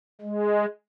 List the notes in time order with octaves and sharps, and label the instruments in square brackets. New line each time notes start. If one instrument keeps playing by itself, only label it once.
[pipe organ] G#3